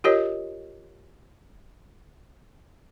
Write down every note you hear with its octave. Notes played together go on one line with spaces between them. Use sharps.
F4 G4 A#4 C#5 D#5